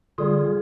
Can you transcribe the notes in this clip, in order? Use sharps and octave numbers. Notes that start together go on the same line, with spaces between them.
D3 G3 F4 G#4